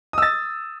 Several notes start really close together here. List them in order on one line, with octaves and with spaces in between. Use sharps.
D#6 E6 A6